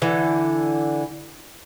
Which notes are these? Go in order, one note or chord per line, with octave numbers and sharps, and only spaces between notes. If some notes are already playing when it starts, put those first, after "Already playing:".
D3 E3